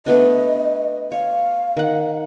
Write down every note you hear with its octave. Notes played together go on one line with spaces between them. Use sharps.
A3 B3 D4 D#5
C#5 F5
D#3 F#5